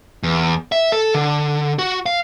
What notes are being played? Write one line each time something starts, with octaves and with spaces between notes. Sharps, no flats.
E2
E5
A4
D3
F#4
F5